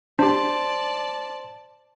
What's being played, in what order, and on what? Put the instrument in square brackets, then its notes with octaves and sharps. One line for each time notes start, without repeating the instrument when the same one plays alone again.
[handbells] D4 G4 [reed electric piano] C5 C6 [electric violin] D5 A5